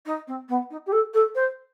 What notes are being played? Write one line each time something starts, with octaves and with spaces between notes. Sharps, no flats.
D#4
C4
B3
D#4
G4
A4
A4
C5